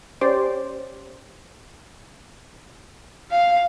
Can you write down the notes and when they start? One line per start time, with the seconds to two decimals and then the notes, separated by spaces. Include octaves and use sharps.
0.21 C#4 G4 C5 D5
3.31 F5